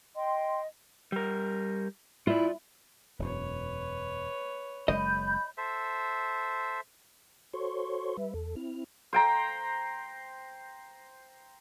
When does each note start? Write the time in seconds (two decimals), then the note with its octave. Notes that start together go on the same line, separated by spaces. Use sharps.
0.15 D#5 G5 C6
1.12 G3 A#4
2.27 E4 F4 D5
3.19 E1 F#2 B4 C#5
4.88 F#1 G#3 D#5 B5 G6
5.57 A4 C5 E5
7.53 F#4 A4 C5 C#5 C6 C#6
8.17 G3 B4 E5
8.34 E2 A4
8.56 C4 E4 F6
9.13 C5 G5 A#5